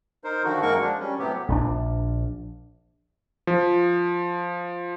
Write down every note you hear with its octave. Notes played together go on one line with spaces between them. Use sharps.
D#4 A#4 C5
D3 D#3 F3 F#4
F#2 G#3 A#3 F#4 A#4 C#6
F3 G#3 D4
G3 C#4
A2 C3 F#3 B3 G4
A#1 F3 D4
F3